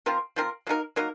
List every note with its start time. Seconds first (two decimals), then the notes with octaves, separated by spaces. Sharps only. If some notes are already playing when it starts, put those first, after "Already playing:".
0.06 F3 C4 F4 A#4
0.36 F3 C4 F4 A#4
0.67 F#3 A#3 D#4 A#4
0.96 F#3 A#3 D#4 A#4